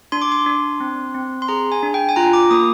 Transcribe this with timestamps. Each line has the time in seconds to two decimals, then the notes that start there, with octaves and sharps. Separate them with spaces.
0.12 D4 C6
0.22 D6
0.32 C6
0.46 D4
0.80 C4
1.15 C4
1.42 C6
1.48 G#4 A#5
1.72 G#5
1.83 D4
1.94 G5
2.09 G#5
2.16 F4 A#5
2.33 D6
2.51 A#3 D#6